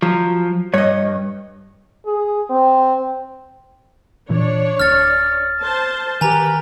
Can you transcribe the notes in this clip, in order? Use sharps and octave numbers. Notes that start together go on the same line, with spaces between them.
F3 F#3
G2 C#5 D#5
G#4
C4
A#2 E3 D4 C#5
D1 F6 A6
C5 A5
D#3 G4 A#4 B4 G#5 A#5